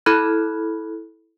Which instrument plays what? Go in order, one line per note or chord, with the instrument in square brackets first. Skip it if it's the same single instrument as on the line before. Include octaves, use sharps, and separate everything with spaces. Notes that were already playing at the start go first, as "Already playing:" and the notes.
[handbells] E4 A4 B5 F6 F#6 G#6